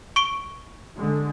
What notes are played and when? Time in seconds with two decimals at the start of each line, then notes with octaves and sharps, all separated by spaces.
0.16 C#6 D7 G7
0.97 D3 G#3